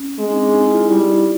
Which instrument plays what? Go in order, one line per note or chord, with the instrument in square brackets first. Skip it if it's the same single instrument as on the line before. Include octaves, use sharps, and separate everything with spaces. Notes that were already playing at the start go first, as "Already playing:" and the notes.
Already playing: [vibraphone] C#4
[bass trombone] G#3 [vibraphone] C4
[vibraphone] D#4
D4
D#4
E4
F4
E4
[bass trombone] G3 [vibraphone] F4